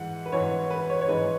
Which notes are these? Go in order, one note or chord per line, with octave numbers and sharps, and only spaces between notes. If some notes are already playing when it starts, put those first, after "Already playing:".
Already playing: G#2 E3 F#5
B4
G#2 E3 G#3 C#5
B4
C#5
C#5
G#2 E3 G#3 B4